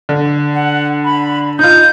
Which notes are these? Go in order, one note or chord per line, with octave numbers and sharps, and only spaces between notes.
D3
F#5
B5
D#4 F4 G6